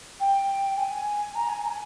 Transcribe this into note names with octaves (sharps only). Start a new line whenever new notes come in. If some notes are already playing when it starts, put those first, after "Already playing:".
G5
G#5
A#5
G#5
A#5
G#5